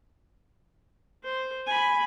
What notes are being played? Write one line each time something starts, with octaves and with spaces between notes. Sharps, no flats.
C5
G#5 B5